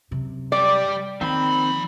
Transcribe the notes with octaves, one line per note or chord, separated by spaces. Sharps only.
F#2 C3
G3 G4 D5
D#3 F3 A#3 C4 B5